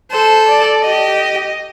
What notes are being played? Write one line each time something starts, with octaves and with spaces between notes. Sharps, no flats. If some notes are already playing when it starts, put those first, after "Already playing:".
A4 C5
D5
G4 D#5